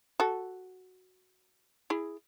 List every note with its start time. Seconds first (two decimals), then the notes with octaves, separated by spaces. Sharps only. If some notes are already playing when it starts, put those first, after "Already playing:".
0.20 F#4 A4
1.90 E4 G#4